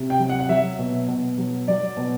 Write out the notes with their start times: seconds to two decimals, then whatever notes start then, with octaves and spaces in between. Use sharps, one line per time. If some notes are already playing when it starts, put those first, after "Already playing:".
Already playing: C3
0.10 G5
0.19 F#3
0.29 F#5
0.40 F#5
0.49 F#3 E5
0.79 B2
1.08 B2
1.38 F#3
1.68 F#3 D5
1.97 B2